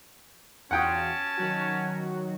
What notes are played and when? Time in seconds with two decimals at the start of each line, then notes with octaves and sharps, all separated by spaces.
0.71 E2 C#4 F4 F#4 F#5 G5 A5 D#6
1.37 D#3 F#3 F#4